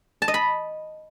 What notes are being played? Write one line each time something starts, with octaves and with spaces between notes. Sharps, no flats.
A5
D#5
B5